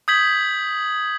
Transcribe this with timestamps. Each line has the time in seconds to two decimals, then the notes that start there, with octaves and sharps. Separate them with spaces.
0.08 D#6 G6 G#6 B6 F#7